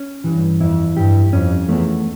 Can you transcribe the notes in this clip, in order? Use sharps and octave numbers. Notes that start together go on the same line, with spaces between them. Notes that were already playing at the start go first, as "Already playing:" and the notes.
Already playing: C#4
G2 E3
F2 E4
G2 G4
F2 C#4
E2 A3